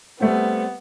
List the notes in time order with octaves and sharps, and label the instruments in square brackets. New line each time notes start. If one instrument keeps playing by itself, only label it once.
[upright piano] G3 A3 C4 [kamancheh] B3